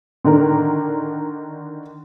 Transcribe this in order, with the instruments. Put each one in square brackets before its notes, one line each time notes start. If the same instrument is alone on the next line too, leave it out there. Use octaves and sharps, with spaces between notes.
[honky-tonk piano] D3 D#3 D4 A#4